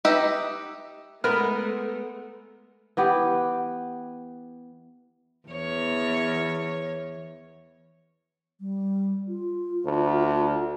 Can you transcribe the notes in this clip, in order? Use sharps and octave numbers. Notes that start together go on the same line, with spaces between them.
D#4 G4 B4 D#5 E5
G#3 A3 B3 A#4 B4 F6
E3 B3 G4
E2 C#5
G3
F4
D2